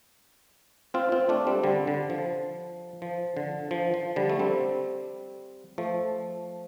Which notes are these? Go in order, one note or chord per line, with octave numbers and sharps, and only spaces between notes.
C4 F4
C4 F4
A3 D4
G3 C4
D3 G3
D3
F3
F3
D3
F3
F3
D3 G3
A3
G3 C4
F3 A3